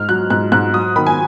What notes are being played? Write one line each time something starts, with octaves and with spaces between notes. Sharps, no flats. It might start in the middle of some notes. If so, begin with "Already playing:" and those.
Already playing: G#2 F6
F#3 F#6
G#2 F#6
G#2 F#6
F#3 D#6
D#3 B5
G#5